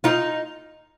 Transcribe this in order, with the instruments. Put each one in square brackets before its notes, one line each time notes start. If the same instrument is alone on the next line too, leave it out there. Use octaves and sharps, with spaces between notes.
[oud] D#4 F4